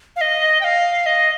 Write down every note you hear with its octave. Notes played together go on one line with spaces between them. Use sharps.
F5
D#5
G5
F5
D#5